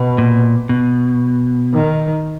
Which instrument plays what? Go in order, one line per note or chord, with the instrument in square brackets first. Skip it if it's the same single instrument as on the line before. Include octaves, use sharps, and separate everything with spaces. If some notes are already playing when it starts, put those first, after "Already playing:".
Already playing: [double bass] B2
[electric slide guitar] A#2
B2
[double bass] D#3